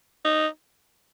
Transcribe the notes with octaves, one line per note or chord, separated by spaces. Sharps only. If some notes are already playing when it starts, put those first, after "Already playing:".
D#4